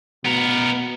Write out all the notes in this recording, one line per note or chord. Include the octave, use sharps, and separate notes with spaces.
B2 B3 A#4